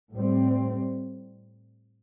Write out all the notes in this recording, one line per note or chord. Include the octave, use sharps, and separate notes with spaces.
A2 G3 C4